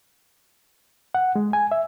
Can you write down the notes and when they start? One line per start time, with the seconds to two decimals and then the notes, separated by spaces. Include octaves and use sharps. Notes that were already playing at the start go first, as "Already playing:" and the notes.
1.15 F#5
1.36 G#3
1.53 G#5
1.71 E5